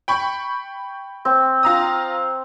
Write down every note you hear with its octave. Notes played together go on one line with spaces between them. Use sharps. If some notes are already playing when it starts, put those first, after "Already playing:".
G5 B5 C#6
C4
F4 A#5 D#6